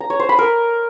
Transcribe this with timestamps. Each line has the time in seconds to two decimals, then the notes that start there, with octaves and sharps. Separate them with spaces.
0.01 A#5
0.10 C#5
0.20 C5
0.29 B5
0.39 A#4